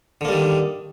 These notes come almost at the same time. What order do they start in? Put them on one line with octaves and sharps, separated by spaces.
D3 A#3 G3 D#3